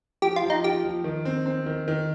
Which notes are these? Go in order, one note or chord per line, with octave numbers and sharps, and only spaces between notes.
F3 G4
F4
F3
D#4
F4 G4
F3
D#3
C4
C4
D#3
D#3